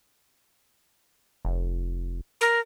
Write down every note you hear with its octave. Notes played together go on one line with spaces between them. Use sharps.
F1
A#4